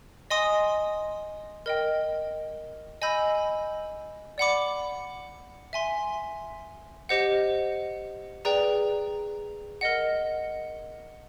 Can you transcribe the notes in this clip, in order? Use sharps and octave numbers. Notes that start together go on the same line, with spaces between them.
D#5 G#5 C6 D#6
A#4 D#5 G5
D#5 G#5 B5 E6 G6
D5 F#5 B5 D6
E5 G#5 C6
G4 C5 D#5 F#5
G#4 B4 D5 G5 A#5
A#4 D#5 F#5